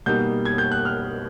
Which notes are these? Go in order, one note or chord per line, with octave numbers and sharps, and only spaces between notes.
B2 G3 A#3 D#4 G6
G#6
G6
F#6
F6